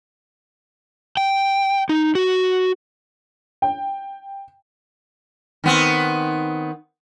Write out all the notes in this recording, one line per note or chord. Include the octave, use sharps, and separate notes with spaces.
G5
D#4
F#4
G5
D#3 B3 C4